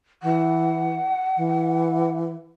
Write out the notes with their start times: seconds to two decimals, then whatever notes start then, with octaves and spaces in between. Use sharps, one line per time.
0.23 E3 F#5
1.37 E3